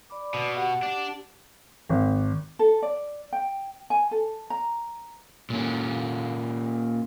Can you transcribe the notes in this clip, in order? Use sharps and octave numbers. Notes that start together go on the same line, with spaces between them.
D5 B5 D6
B2
G4 F#5
D4
G#1
A4
D5
G5
G#5
A4
A#5
A#2 C#4